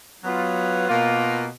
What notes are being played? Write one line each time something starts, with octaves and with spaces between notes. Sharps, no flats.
F#3 B3 F4
B2 A#3 F4